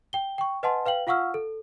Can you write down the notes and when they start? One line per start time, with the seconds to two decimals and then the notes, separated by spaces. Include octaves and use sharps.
0.13 G5 G7
0.38 G5 C#6
0.63 B4 D#5 F#5 G#5 A5 C6
0.86 B4 F5 G5 F#7
1.07 F4 F5 F#5 C#6 E6 F6
1.34 A4